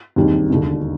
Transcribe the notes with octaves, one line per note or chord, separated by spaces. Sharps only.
E1 D#2 D#3 G3 C4
E1 D#2 D3